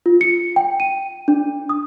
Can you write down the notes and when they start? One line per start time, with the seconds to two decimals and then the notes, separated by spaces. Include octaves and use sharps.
0.06 F4
0.21 C#7
0.56 G5
0.80 D#7
1.28 D4
1.69 D#6